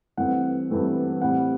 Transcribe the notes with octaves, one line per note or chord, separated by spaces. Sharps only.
G2 E3 A3 C4 F#5
G2 E3 A3 C4
A2 G3 C4 F#5